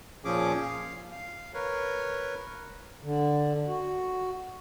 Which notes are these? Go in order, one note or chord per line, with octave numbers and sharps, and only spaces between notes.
A#2 F3 C#4 G#4 D6
F5
F5
A#4 B4 C#5
D3
F#4